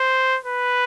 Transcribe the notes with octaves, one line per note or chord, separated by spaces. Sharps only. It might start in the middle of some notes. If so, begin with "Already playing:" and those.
Already playing: C5
B4